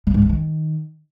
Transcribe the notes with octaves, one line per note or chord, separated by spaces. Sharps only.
G2
G#2
F3
D#3